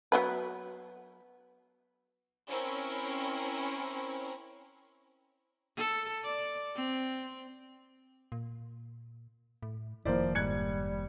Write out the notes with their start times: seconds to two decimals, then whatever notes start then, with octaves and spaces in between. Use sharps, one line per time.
0.12 F#3 B3 B4
2.49 C4 C#4 E4 A#4
5.77 A4
6.24 D5
6.76 C4
8.32 A#2
9.62 A2
10.05 F1 D#3 F3 A#3 E4 A#4 C5 D5
10.35 G#2 G3 F#6 G#6 C#7